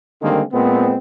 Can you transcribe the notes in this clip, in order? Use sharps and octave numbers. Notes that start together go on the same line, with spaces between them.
D3 D#3 G3 G#3 A#3 C4
A#2 G#3 B3 C4